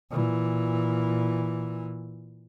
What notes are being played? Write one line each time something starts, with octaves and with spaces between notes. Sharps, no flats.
A#2 E3